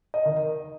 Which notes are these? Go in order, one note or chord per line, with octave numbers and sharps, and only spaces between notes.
D#5
D#3